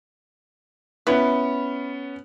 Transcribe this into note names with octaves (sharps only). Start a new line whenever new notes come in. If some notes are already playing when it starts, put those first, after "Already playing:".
B3 C#4 E4 B4